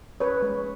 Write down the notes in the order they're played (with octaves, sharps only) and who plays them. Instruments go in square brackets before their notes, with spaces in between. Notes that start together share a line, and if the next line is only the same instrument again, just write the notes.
[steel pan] C#4 B4 C#5
G#3